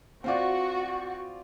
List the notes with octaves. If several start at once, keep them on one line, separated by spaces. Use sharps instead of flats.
C4 F4 F#4 D5 C#6